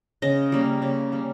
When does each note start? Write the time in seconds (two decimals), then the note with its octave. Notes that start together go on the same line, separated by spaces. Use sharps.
0.22 C#3 D#5
0.52 G3 A#3 C#4
0.82 C#3
1.12 G3 A#3 C#4